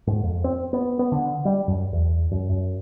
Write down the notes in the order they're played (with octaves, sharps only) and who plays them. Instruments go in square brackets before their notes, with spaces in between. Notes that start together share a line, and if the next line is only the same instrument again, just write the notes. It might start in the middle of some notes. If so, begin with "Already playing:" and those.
[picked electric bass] G#2
F2
C4
B3
B3
D3
G3
F#2
E2
F#2
F#2